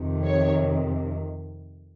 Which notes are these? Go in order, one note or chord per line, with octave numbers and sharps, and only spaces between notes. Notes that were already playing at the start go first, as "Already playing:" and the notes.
Already playing: F2 C3 D#3
C#5